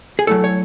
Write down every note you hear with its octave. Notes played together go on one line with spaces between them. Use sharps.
G#4
F#3 A3 E4 A4
C#5